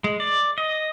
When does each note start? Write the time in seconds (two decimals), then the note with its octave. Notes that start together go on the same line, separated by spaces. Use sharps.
0.04 G#3
0.20 D5
0.58 D#5